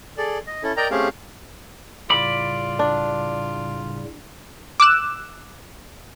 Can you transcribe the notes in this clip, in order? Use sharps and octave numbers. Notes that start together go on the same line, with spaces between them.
G#4 A4 D5
D#5
C#4 E4 A4
A#4 D5 D#5 G5 A#5
A3 C4 C#4 G4 G#4 F5
A2 C#3 G3 F4 D5 B5
D4
D6 E6 F#6 E7